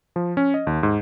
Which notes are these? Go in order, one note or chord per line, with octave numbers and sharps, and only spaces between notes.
F3
C#4
D#5
D#2
G#2